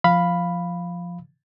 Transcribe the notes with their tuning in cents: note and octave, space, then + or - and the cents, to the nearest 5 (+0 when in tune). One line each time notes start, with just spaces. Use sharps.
F3 +0 F5 +0 B5 +0